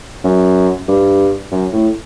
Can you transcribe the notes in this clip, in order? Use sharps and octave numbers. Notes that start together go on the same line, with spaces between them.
F#2
G2
F#2
A2